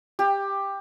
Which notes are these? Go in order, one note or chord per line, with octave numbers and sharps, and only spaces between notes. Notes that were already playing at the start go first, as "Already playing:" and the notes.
G4